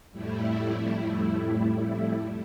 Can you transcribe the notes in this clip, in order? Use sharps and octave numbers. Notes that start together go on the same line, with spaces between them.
F2 A2 G3 A3 E4